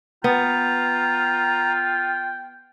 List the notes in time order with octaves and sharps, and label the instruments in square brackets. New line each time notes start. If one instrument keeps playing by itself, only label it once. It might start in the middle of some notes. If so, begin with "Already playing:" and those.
[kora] B3 [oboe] F4 [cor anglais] G5 [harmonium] A#5